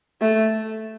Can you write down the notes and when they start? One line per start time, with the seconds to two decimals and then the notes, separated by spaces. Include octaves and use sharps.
0.21 A3